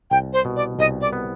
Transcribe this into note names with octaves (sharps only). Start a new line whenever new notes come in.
C2 G5
C5
B2
D5
C2 D#5
D5
B3